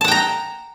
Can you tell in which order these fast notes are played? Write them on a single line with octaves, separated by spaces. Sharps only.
A5 F#5 G5 A#5